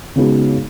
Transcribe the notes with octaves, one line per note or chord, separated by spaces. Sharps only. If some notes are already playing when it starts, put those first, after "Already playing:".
C#3 G#3 B3 D#4 F#4